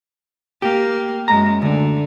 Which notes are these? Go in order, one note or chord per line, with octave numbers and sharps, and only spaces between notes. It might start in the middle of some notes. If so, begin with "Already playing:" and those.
A#3 G4
F#2 G#3 A#5
D2 D3